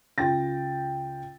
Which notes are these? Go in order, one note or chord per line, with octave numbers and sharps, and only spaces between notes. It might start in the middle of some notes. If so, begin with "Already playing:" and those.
C#2 F4 G5 A6 A#6